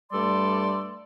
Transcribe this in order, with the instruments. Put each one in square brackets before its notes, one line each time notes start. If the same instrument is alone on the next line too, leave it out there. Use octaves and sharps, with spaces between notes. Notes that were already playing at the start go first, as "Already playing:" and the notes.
[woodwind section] G2 G3 A3 A4 D5 C6